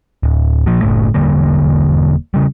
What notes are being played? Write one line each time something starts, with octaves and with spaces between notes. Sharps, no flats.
D1
A#2 F3
F#1 A2 A3
E1 D3 G3 A#3
C#3 G3